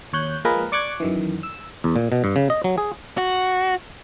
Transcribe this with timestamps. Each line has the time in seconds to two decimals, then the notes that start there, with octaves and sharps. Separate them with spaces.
0.13 D#2 C#5 F#6 G6
0.45 F3 G#3 A#3 G#4 A#4 B4
0.72 D5 C#6 D6 F#6 G#6
1.00 F#2 D#3 E3
1.43 E6
1.84 E2
1.96 A#2
2.12 B2
2.24 G2
2.36 C#3
2.50 D#5
2.64 F#3
2.78 G#4
3.18 F#4